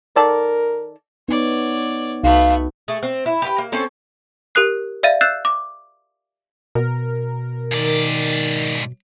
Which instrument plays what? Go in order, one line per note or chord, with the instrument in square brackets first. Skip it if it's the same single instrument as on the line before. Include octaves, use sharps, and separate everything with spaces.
[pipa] D#3 A4 D5 [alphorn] A#4
[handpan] B3 D#4 [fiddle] C#5 D5
[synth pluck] C2 [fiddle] A3 B3 [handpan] D#4 F#4 [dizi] F5
[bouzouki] A3 G#4
C4
E4
G4 B4 G5
A#3
C4 C#4 A4
[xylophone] G4 A#4 D#6 F#6 C7
D5 E5 F5 A6 D#7
E6 F#6 G6 A6 C7 E7
D6
[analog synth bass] B2 [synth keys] A#4
[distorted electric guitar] G#2 D5 [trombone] D#3